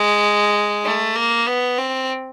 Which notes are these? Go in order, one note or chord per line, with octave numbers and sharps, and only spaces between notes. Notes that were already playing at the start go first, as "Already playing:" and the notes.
Already playing: G#3
A3
A#3
B3
C4